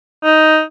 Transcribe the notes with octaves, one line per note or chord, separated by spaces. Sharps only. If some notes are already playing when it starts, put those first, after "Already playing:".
D#4